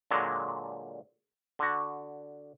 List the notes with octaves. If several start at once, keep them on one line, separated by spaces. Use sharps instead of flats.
A#2 D3 F#3 G#3
D3 F#4